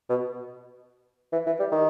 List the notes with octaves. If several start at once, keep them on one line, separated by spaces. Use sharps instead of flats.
B2
E3
E3
G3
D#3